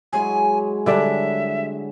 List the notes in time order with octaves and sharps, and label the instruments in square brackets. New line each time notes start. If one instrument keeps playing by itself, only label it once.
[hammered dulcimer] F#3 G#3 E4 [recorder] G#5
[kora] D3 G3 D4 [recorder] E5